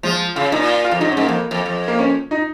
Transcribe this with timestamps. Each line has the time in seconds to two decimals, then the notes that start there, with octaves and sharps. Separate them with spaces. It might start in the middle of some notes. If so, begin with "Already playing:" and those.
0.03 F3 G#3
0.36 C#3 F4
0.52 A#2 D#4
0.68 F4
0.84 F4
0.91 F2
1.00 G#2 D#4
1.12 C#4
1.17 G#2
1.22 A#3
1.28 F2
1.51 F2
1.66 F2
1.88 A#3
1.99 C#4
2.31 D#4